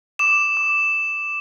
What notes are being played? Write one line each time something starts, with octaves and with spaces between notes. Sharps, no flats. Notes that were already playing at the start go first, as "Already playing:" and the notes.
D6 E7
D6